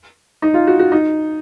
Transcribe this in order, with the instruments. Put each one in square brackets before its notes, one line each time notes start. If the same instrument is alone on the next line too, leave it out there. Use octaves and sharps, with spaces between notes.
[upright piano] D#4
F4
F#4
F#4
D#4